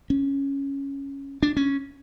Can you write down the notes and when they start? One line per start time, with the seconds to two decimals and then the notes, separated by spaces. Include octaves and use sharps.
0.10 C#4
1.43 D4
1.57 C#4